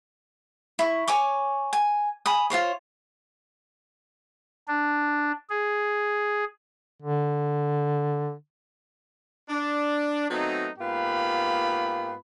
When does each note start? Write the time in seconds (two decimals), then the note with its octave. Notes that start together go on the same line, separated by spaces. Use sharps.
0.79 E4 C#6
1.08 C#5 G#5 C#6 D6
1.73 G#5
2.26 G#5 B5 D#6
2.50 F4 F#4 C5 C#5
4.68 D4
5.50 G#4
7.03 D3
9.50 D4
10.30 F#3 A3 B3 C4 D#4
10.79 G#2 A#3 B3 F4 G4 B5